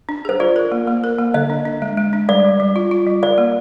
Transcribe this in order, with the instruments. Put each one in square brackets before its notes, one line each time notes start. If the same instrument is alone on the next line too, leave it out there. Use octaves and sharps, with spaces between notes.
[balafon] D4
[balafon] G#4 [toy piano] C5
[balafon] F4 [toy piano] D5
[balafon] A#4
A#3
A#3
A#4
A#3
[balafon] D3 [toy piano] D#5
[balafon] D4
D4
G#3
G#3
D4
[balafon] G3 [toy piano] D5
[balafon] G3
G3
F4
F4
G3
[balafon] A#4 [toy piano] D5
[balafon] A#3